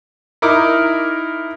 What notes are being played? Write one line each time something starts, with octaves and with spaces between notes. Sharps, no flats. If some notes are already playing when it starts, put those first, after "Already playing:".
D#4 E4 A#4 D6